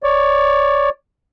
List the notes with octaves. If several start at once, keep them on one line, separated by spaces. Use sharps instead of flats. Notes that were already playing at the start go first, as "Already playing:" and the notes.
C#5 D5